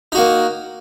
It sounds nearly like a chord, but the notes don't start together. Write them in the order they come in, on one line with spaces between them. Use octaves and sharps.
D#4 F#4 A#3